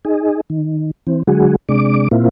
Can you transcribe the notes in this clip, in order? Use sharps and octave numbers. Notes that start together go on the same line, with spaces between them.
D#4 G#4
D#3
E3 C4
D3 F#3 G#3 F#4 G#4
C3 G#3 D4 D6
A#2 A#3 C4 E4 F4